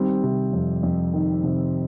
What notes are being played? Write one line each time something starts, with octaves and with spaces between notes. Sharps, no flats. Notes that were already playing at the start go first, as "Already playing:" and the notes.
Already playing: D#3 G3 C4
C3
F2
F2
D#3
C3